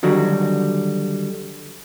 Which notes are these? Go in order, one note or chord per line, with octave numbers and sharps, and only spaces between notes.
D3 D#3 F#3 G3 F#4